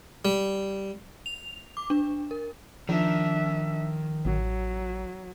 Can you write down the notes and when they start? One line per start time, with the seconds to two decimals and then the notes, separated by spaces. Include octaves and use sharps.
0.25 G3
1.26 F7
1.77 D6
1.90 D4
2.31 A#4
2.89 D#3 F3 D4 E5
4.25 A1 F#3